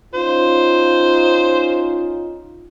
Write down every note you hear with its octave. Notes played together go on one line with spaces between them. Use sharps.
C#4 D#4 F4 C5